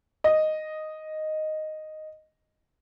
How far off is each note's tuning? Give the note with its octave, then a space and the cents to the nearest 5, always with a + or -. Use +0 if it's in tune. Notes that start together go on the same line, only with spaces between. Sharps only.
D#5 -5